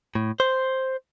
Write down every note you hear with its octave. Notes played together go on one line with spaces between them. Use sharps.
A2
C5